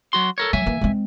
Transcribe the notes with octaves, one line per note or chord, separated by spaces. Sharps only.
F#3 F#4 C6
A4 A#4 C#5
F#3 E5 G#5
E3 A#3
G#3 C4